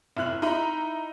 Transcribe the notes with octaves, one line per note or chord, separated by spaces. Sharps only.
F1 E4 F6 F#6 F#7
D#4 E4 A#5 B5